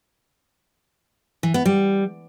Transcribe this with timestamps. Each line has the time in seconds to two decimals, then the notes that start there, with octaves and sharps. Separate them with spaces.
1.43 E3
1.54 B3
1.66 G3